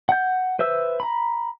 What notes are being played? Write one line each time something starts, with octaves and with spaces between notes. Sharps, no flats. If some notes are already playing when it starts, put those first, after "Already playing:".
F#5 G6
B4 C5 E5 E6
A#5 B5